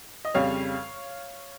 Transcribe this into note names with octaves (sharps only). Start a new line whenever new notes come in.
D#5
F2 C#3 G3 C#5 F5